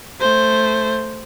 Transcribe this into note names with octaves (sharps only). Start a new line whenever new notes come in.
A3 C5